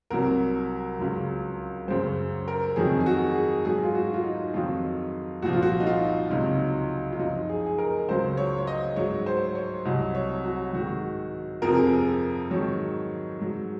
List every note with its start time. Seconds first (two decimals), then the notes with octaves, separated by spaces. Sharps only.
0.10 C2 C3 F#3 A#4
0.99 C#2 C#3 F#3
1.88 F#2 C#3 F#3 C5
2.48 A#4
2.76 F2 D#3 F#3 G#4
3.00 G#4
3.06 F#4
3.35 G#4
3.65 G#2 F#3 G#4
3.83 F4
3.95 F#4
4.14 F4
4.24 D#4
4.54 F2 D#3 F#3 F4
5.42 C2 A#2 F3 F#4
5.53 F4
5.62 F#4
5.80 D#4
5.86 F4
6.30 C#2 C3 F#3 D#4
7.12 F4
7.19 F#2 D#4
7.24 F3
7.49 G#4
7.66 G#4
7.78 A#4
8.08 C#2 C#3 F#3 C5
8.37 C#5
8.58 C#5
8.67 D#5
8.96 G#2 F#3 C#5
9.26 C5
9.55 C#5
9.85 C2 C3 F#3 D#5
10.15 C#5
10.44 F#4
10.73 G#2 D#3 F#3 F#4
11.62 F2 C3 F3 A#4
11.74 G#4
11.87 A#4
12.51 G#2 D#3 F#3 C#5
13.40 G#2 F#3